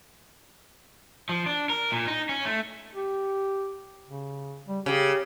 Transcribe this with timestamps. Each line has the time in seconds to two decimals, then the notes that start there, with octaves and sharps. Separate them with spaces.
1.29 F3
1.46 D4
1.70 A#4
1.92 A#2
2.07 D#4
2.29 C#4
2.45 A3
2.94 G4
4.08 C#3
4.68 G3
4.86 C#3 G4